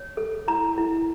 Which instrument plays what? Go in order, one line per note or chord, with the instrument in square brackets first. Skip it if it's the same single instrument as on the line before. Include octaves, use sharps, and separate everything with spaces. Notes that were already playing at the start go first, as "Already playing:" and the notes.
Already playing: [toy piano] C#5
A4
E4 A#5
E4